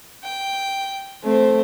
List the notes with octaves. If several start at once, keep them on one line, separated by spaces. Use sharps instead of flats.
G5
A3 C4 C5